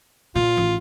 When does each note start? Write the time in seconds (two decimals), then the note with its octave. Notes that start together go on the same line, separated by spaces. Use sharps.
0.35 A#2 F4
0.57 A1